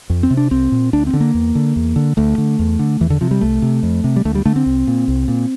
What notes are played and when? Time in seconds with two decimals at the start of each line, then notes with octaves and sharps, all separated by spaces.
0.10 F2
0.23 C4
0.31 C3
0.37 D4
0.51 C2 C4
0.72 A#2
0.93 D2 D4
1.07 C4
1.13 D3
1.20 A#3
1.34 E2
1.55 D3
1.76 E2
1.96 D3
2.17 D2 A3
2.38 D3
2.59 E2
2.79 D3
3.00 E2 E3
3.10 D3
3.21 C3 F3
3.31 G3
3.41 C2 A3
3.62 C3
3.83 F2
4.04 C3
4.16 G3
4.25 D2 A3
4.35 G3
4.46 D3 A3
4.56 C4
4.66 C2
4.87 A#2
5.08 C2
5.28 A#2